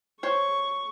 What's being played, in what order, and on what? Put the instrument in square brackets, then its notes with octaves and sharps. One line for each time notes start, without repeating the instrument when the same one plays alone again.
[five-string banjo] C5 C#5 [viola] C#6